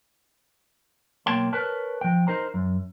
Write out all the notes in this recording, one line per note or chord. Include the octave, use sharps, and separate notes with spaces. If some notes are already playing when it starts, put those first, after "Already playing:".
B1 A#3 C#5 G5 A5 C6
A#4 B4 C#5 A5
F3 G5
D#4 A#4 C5 A#5
F#2